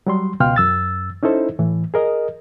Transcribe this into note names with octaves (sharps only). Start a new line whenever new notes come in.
F#3 G3 C6
C#2 B2 F5 G5 C6 F6
F#2 E6 A6
C#4 D#4 E4 A4 C5
A2 E3
G#4 A#4 D#5